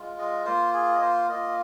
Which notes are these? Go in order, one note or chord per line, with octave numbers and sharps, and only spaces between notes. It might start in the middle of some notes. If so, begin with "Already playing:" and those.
Already playing: G#3 F4
D#5
A#3 F4 C5
G#4
D#5
C5
A#3 F4 D#5